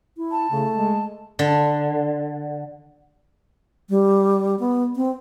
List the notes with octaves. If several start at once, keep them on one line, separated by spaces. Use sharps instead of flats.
E4
A5
C#3 A3
G#3
D3
G3
B3
C4